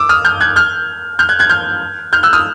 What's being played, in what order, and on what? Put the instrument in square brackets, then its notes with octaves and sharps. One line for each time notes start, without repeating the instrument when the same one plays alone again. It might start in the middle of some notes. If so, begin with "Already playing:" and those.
Already playing: [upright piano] D6 E6
D#6 F6
F6 G6
F#6 G#6
F6 G6
F6 G6
F#6 G#6
F#6 G#6
F6 G6
F6 G6
E6 F#6
D#6 F6